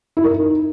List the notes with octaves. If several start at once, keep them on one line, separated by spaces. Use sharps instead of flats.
E4
A#4
D#4